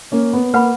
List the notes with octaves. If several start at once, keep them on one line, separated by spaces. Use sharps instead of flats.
A#3 C#4
B3
A#3 B4 F#5 B5